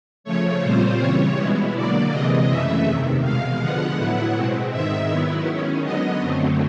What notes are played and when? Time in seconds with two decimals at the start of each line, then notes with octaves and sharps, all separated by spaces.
0.24 C#3 F3 A3 C#5
0.62 A#2 G3 C4 F4 C5
0.99 C#3 E3 G3 C#5
1.36 B2 G#3 B3 E4
1.73 D3 F#3 A#3 D5
2.11 C3 E3 G#3 D#5
2.48 F#2 C#3 E3 A3 E5
2.86 E2 C3 D#3
3.22 E2 B2 G#3 F5
3.59 D3 F3 G#3 B3 F#5
3.97 A2 F#3 B3 E4 F#5
4.34 B2 G#3 C4
4.71 G#2 D#3 G#3 E5
5.10 D#3 F#3 B3 E4
5.46 D#3 G#3 C#4
5.83 D3 F#3 B3 D#5
6.20 F#2 D3 F#3 A3 C4